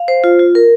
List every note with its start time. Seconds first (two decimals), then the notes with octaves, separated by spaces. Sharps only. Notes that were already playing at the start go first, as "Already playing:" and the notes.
Already playing: F5
0.08 C5
0.24 F4
0.39 F4
0.55 A#4